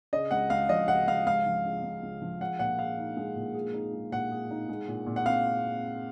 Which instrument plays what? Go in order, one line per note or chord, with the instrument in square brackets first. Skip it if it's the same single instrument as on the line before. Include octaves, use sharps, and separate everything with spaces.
[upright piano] C#3 [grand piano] D#5
[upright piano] C#2 [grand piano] F#5
[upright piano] C#2 [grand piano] F5
[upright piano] F3 [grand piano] D#5
[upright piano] C#3 [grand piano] F#5
[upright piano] C#2 [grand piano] F5
[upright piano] C#2 [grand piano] F5
[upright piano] F3
C#3
C#2
C#2
F3
[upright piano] G#3 [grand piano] F#5
[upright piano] A#2 [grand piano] F#5
[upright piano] G#4 [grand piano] F5
[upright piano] D#4
G#3
A#2
G#4
D#4
G#3
[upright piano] A#2 [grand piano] F#5
[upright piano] G#4
D#4
G#3
A#2
A#2
[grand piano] F#5
[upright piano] C4 [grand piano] F5